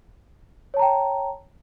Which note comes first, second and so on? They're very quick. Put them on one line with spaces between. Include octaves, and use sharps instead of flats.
C#5 A5 A#5 G5